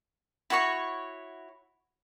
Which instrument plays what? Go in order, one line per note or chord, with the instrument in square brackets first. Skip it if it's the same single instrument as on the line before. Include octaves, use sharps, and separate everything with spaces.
[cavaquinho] E4 F#4 C#5 C#6